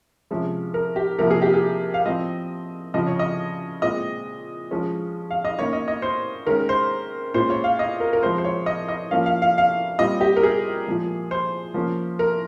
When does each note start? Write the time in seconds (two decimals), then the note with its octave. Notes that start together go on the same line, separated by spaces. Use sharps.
0.31 C3 F3 G#3 C#4
0.74 A#4
0.96 G4
1.18 C3 F3 A#3 A#4
1.31 G#4
1.42 G4
1.54 G#4
1.94 F5
2.06 F3 C4 D#5
2.94 C#3 F3 C4 D#5
3.07 C#5
3.19 D#5
3.82 A#2 G#3 C4 D#5
4.71 F3 G#3 C#4
5.31 F5
5.45 D#5
5.59 D#3 A#3 C#4 C#5
5.73 D#5
5.88 D#5
6.02 C5
6.47 D#3 G#3 C#4 A#4
6.69 C5
7.34 A#2 G#3 C#4 C5
7.50 C#5
7.64 F5
7.79 D#5
8.00 A#4
8.13 A#4
8.22 F3 G#3 C4 C5
8.38 C5
8.44 C#5
8.66 D#5
8.89 D#5
9.11 F3 A#3 C#4 F5
9.26 F5
9.42 F5
9.58 F5
9.99 A#2 G3 C4 D#5
10.21 G4
10.36 A#4
10.43 G#4
10.87 A#2 F3 G#3
11.31 C5
11.74 F3 A#3 C#4
12.19 A#4